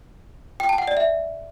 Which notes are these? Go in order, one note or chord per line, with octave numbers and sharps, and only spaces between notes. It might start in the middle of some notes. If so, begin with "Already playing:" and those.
G5
A5
F#5
D5
E5